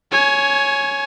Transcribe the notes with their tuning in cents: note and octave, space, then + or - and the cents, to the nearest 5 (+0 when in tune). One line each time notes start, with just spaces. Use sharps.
C#5 +0 G#5 +20